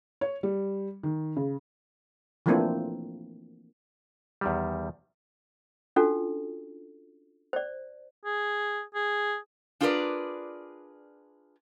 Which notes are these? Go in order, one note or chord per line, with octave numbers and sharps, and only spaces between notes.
C#5
G3
D#3
C#3
E3 F3 A3 A#3 C4 D4
E2 D#3 G3
C#4 D4 F4 F#4 A4
C5 D5
G#4
G#4
D4 F4 G#4 A#4 B4 D5